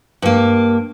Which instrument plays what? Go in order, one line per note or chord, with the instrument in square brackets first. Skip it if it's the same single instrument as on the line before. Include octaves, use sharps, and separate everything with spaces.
[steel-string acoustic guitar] G2 A#3